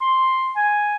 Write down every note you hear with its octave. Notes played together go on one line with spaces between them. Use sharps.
C6
G#5